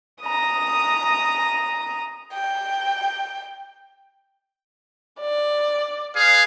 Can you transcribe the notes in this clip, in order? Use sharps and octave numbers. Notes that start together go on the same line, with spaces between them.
A#5 D#6
G5
D5
G#4 B4 F5